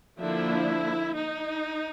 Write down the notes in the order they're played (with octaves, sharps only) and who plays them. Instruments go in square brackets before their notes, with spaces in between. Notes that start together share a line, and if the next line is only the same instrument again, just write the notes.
[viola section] D3 F3 A#3 D4 E4
D#4